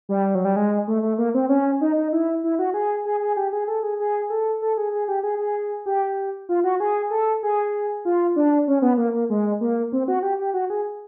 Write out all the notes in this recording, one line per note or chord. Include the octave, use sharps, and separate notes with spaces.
G3
F#3
G3
G#3
A3
A3
A#3
C4
C#4
D#4
D#4
E4
E4
F#4
G#4
G#4
G#4
G4
G#4
A4
G#4
G#4
A4
A4
G#4
G#4
G4
G#4
G#4
G4
F4
F#4
G#4
A4
G#4
F4
D4
C#4
B3
A#3
A#3
G#3
A#3
C4
F#4
G4
G4
F#4
G#4